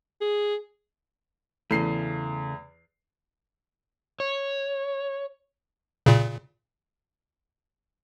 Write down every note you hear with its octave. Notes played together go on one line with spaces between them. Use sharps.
G#4
E2 C#3 A3 C7
C#5
A#2 C#3